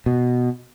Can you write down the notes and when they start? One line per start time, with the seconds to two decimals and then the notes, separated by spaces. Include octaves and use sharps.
0.06 B2